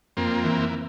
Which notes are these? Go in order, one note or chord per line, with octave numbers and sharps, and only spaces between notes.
F2 A#3 C4
E3